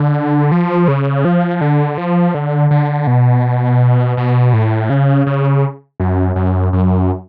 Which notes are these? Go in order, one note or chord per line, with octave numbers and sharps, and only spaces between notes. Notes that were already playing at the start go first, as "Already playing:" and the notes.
Already playing: D3
F3
C#3
F3
D3
F3
D3
D3
B2
B2
A2
C#3
C#3
F#2
F#2
F#2